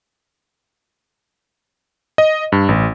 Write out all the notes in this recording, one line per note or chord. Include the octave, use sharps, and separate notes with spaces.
D#5
G2
A1